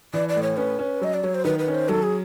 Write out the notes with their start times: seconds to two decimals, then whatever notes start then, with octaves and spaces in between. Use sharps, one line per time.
0.13 E3 D5
0.29 D5
0.36 A2
0.43 C#5
0.57 C#4 B4
0.79 C#4
1.01 F#3 D#5
1.14 D5
1.23 F#3 C#5
1.35 C5
1.44 D#3 B4
1.59 B4
1.68 C#4
1.74 C5
1.89 F#3 A4
2.03 G#4